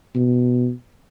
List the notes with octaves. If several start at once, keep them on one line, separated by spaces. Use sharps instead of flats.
B2